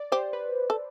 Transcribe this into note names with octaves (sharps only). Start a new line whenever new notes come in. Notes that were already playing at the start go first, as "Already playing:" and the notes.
Already playing: D5
G4 C5
B4
A4